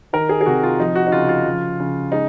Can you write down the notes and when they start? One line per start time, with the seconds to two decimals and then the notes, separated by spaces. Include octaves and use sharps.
0.13 D#3 A#4
0.29 G#4
0.41 G#4
0.46 C3 F#4
0.63 F4
0.79 F3 D#4
0.96 F#4
1.07 D#4
1.12 C#3 F4
1.29 F4
1.46 F3
1.80 C#3
2.12 G#3 D#4